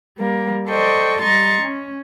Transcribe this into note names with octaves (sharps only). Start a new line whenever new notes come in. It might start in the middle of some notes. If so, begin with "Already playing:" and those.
G3 A#3
A4 C5 D5 D#5 G5 C#6
G3 D#5 A#5 C6 C#6 A6
C#4